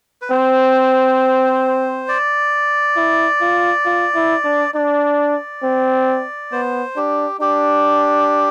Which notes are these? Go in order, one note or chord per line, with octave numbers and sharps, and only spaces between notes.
B4
C4 C5
D5
E4
F4
F4
E4
D4
D4 D5
C4
B3 C5
D4 G4
D4 G4